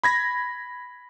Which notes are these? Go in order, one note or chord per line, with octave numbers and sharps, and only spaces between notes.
B5 G#6 A#6